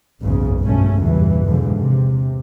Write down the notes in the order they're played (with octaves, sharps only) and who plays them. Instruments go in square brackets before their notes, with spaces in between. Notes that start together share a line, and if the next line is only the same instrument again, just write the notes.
[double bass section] F#1 B1 E2 G#2 C#3
G1 G#2 B2 A3 C#4
F#1 E2 G2 A#2 E3
E2 G#2 B2 D3 F3
C3